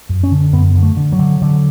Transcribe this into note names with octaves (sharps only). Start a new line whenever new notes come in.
F#2
C#4
D3
F#2 B3
D3
A3
D3
F#3
D3
D3